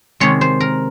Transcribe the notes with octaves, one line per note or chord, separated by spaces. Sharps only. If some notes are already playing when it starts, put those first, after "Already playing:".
C3 D#3 G#3 C#5
C5
A#4